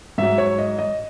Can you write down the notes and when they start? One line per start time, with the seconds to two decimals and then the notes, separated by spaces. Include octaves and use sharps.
0.18 G#2 F#3 E5
0.38 C#5
0.59 D#5
0.79 D#5